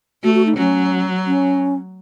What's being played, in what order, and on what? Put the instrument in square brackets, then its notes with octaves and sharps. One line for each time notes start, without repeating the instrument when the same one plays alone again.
[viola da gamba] A3 [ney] F#4
[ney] F#4
D#4
[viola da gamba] F#3 [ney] C#4
[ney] C#4